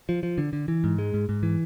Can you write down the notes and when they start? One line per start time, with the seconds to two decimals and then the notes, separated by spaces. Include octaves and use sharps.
0.09 F3
0.23 F3
0.38 D3
0.53 D3
0.68 E3
0.84 G#2
0.99 G#3
1.14 G#2
1.29 G#2
1.43 E3